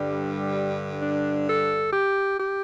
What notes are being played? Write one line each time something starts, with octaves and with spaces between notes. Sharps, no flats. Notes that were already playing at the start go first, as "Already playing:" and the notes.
Already playing: G2 D3 G3
D4
A4
G4
G4